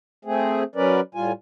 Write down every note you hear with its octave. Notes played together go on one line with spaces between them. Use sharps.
A3 C4 G#4
F#3 C#4 A#4 B4 D5
A2 G3 F4 G#5